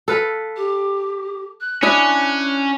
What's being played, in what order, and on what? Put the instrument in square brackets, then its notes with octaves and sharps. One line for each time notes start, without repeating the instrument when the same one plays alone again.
[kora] A4 B4 F5
[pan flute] G4
F#6
[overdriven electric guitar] C#4 [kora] D4 E4 D#5